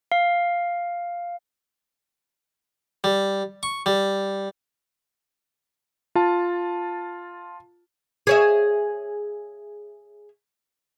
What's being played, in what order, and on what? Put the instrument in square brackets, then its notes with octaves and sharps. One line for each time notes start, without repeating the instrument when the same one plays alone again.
[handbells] F5
[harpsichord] G3
C#6
G3
[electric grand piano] F4 A5
[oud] G#4 C#5 E5